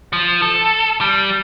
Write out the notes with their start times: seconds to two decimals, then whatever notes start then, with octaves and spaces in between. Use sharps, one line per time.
0.13 F3
0.42 A4
1.01 G3